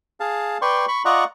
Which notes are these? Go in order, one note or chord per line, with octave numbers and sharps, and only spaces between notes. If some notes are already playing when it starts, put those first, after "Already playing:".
G#4 F5 A5
B4 D5 G5 C6 C#6
B5 C#6
F4 D5 D#5 F#5 A#5 C#6